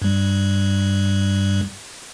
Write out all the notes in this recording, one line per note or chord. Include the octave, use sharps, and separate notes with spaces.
G2 G3